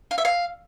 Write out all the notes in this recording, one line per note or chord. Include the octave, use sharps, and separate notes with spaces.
F5
E5
F5